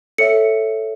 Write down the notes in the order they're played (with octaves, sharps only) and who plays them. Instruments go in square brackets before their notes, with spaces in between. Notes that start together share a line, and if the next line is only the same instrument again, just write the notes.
[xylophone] A4 C#5 E5 C#7